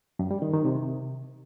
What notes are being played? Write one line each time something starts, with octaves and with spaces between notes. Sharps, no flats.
F#2
G3
D#3
D#3
C3